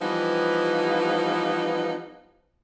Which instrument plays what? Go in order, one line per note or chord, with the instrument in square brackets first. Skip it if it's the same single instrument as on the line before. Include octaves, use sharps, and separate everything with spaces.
[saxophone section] E3 F3 G3 B3 C4 D#4